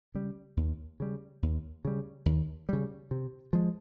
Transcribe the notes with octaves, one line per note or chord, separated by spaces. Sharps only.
C#3 G3
D#2
C#3 G3
D#2
C#3 G3
D#2
C#3 G3
C3
F3 G#3